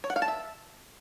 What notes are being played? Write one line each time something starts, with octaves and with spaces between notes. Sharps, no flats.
C#5
F#5
F5
A5
E5